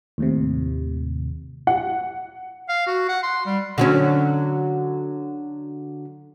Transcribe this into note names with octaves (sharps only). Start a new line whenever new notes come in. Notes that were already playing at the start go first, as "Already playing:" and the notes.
D#2 A2 C3
F#5
F5
F#4
F#5
C6
G3
D3 F#3 C#4